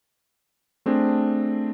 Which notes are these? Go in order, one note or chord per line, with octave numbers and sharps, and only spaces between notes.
A3 C4 D4 G#4